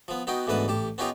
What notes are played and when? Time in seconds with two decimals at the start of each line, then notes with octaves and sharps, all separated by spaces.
0.08 F3 B3
0.27 B3 D#4 F#4 G5
0.47 D2 G#2 E3 B3 B4 A5
0.68 A1 G4 A5
0.98 B3 C#4 D#4 F4 G4 A#4